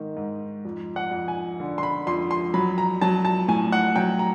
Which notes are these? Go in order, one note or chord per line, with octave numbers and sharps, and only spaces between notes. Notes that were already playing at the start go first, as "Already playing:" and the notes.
Already playing: G#2 D#3
G#2
F2
F#5
F2
G#5
D3
C6
B5
F2 C6
C6
F#3 B5
A#5
F#3 A5
A5
A2 G#5
F#5
F#3 G5
A#5